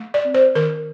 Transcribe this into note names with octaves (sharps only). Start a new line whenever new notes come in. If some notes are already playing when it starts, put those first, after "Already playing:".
Already playing: A3
D5
C4
C5
D#3 A#4